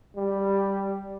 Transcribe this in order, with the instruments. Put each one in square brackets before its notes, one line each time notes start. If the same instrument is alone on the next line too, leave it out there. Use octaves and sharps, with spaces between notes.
[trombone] G3